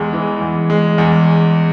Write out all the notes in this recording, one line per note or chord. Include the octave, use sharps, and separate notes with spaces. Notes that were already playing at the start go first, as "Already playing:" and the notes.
Already playing: E2 G#3
E3
E2
G#3
E2